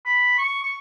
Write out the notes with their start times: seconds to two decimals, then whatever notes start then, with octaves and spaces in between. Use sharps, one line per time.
0.05 B5
0.38 C#6
0.63 C#6